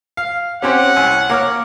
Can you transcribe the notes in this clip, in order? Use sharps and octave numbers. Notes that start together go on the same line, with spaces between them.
F5
C4 C#4 G4 C#5 F#5
C2 G#5
A#3 C#5 F5 D6 F6